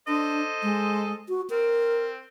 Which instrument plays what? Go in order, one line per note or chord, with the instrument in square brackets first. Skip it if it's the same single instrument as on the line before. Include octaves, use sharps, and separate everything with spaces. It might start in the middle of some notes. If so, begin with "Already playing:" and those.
[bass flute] D4 [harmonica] A4 C5 D#5
[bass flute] G#3
F#4
[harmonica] C4 [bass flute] A#4